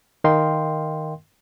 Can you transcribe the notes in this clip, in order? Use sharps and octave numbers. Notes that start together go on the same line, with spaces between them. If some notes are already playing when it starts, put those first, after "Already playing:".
D#3 A#4 D#5 F5 G5 C6